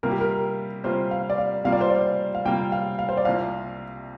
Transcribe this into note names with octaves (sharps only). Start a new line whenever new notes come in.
C3 G3 A#3 F4 A#4
G4
A#4
C3 G3 A#3 F4 C5
F5
D5
F5
C3 G3 A#3 F4 F5
D5
C5
D5
F5
C3 G3 A#3 F4 G5
F5
F5
C5
D5
C2 C3 A#3 F4 F5